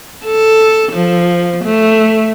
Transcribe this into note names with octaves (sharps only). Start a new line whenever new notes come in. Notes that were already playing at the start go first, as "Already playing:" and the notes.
A4
F3
A3